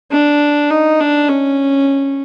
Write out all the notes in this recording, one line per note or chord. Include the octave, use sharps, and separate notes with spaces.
D4
D#4
D4
C#4